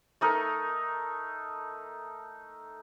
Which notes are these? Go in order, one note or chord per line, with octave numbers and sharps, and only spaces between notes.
A3 D#4 A#4